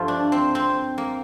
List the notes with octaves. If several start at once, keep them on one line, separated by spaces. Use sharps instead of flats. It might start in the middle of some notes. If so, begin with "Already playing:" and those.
Already playing: G2 F3 A3 F4
D4
C4
C4
A#3